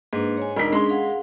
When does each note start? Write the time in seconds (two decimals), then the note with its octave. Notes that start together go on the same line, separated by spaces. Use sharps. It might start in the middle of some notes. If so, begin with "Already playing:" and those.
0.13 G#2 A#3 D4 B4
0.37 C#5 G#5
0.56 E1 D4 D#4 A#4 D#5 B6
0.72 G#3 C#4 D4 G#4 C6
0.89 G#4 F5 F#5